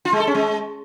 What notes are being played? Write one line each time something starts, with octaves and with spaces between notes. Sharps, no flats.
F4
G#3
A4
C#4
G#3